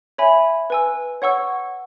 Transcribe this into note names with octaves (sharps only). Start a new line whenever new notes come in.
C#5 E5 G#5 B5
B4 G#5 E6
C#5 F#5 C#6 E6